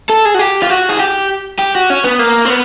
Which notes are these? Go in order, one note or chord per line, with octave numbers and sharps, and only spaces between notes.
A4
G#4
F#4
G4
F4
F#4
G#4
G4
G4
F#4
C#4
B3
A#3
C4
B3